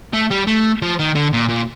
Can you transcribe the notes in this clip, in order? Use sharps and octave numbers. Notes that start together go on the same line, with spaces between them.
A3
G3
A3
F3
D#3
D3
A#2
A#2